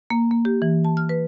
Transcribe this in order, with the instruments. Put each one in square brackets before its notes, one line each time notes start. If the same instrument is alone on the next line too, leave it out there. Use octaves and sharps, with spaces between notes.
[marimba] A#3
A#3
G4
E3
A5
F6
B4